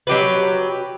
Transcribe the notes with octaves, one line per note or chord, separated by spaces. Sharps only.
F#3 G4 B4